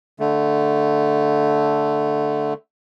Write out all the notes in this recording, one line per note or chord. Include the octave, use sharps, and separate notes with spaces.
D3 A3